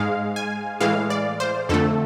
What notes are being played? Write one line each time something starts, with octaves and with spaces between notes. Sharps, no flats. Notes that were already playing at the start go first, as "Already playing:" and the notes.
Already playing: G#2 G#3 F5
G#5
A2 E3 G#3 F5
D5
C5
F2 D3 A3 A4